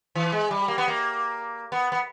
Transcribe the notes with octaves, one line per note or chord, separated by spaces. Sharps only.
E3
G#3
G3
A#3
B3
A#3
B3
B3